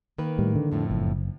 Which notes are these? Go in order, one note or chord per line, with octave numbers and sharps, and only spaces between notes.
D#3 A#3 B4
A2 G3
D3
F2 A2 F3
F#1